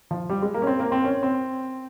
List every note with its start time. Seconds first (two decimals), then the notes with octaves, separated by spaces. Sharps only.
0.11 F3
0.29 G3
0.42 G#3
0.54 A#3
0.62 C#4
0.67 C4
0.80 A#3
0.92 C4
1.04 C#4
1.23 C4